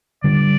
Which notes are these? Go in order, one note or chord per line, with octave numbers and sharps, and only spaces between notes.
D3 G3 D5